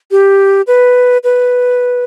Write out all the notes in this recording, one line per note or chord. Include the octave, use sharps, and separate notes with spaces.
G4
B4
B4